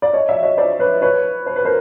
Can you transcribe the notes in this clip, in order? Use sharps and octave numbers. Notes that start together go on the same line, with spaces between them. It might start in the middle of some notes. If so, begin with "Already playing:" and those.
D5
C#5 D#5
D5 E5
C#5 D#5
C5 D5
B4 C#5
B4 C#5
C5
B4
A#4 C5